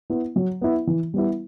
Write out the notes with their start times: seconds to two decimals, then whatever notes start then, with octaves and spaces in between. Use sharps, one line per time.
0.10 B3 E4
0.36 F#3
0.61 B3 E4
0.87 E3
1.14 G3 B3 E4